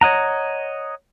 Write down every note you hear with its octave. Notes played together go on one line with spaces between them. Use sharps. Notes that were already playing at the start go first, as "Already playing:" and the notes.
C#5 D#5 F#5 A#5